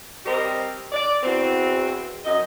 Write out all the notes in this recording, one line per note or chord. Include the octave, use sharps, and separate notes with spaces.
G3 C4 G4 A#4 C5 D#5
D5
E2 C4 F#4
F#2 D#5